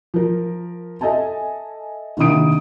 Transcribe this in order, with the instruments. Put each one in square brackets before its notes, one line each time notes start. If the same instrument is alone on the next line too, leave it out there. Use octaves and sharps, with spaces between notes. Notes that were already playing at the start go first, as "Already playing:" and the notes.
[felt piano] F3 A#4
A4 D#5 E5 G#5 A5
A#1 C3 D#3 E4 D#6 D7